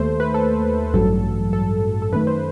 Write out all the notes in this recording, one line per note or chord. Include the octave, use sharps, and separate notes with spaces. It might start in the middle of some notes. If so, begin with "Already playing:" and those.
Already playing: D#2 A3 C5
B4
A4
A1 G2 F#3 A4
A4
A4
F#2 D#3 A3 B4
C5